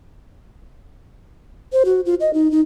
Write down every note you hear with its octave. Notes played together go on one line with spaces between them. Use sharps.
C5
F#4
F4
D#5
D#4
D#4